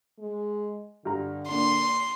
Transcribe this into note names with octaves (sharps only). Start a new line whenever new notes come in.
G#3
G2 D3 A#5
A#2 D4 C6